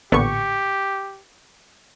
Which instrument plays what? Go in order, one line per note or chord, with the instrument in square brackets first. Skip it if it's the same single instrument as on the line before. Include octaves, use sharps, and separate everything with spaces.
[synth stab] A1 C#6 [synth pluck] A#2 D3 B3 [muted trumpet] G4